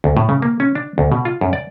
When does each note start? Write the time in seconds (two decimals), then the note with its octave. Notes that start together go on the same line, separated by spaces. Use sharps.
0.04 D2
0.17 A2
0.29 C#3
0.42 A#3
0.60 C#4
0.75 D4
0.98 D2
1.12 B2
1.25 F4
1.41 F#2
1.53 D5